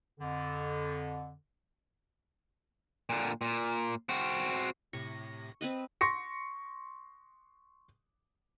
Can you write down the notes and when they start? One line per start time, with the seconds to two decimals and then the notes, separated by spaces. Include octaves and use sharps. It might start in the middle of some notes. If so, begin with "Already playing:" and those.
0.20 F2 D3
3.10 A#2 D3
3.41 A#2
4.09 C4 F#4
4.93 A2 C3 C#6 A#6
5.61 C4 B4 D#5
6.01 C6 C#6 A#6 C#7